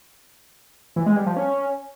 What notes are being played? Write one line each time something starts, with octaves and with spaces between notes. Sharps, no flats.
E3
G#3
G3
F3
C#4